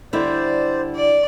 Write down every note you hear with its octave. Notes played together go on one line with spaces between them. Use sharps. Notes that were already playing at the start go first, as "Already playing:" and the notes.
D3 G3 E4 C5 D5
D5